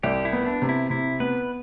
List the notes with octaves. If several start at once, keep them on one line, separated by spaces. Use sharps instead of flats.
C2 G4
E4
B3
D4
C3
E4
C3 E4
B3 B4